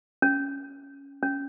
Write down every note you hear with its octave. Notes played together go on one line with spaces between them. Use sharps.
C#4
C#4